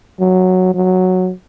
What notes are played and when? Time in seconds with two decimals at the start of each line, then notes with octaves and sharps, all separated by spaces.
0.20 F#3
0.74 F#3